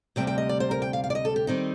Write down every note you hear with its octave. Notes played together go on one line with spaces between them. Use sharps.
D2 C3 G3 G5
G5
D#5
D5
C5
A#4
G5
F5
F5
D5
D#5
A4
G4
D#3 G3 C4 D#4